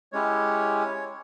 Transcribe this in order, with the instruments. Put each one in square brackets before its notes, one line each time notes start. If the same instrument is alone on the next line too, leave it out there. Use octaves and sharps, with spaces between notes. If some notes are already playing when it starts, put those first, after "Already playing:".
[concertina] G#3 C#4 E4 G4 C#5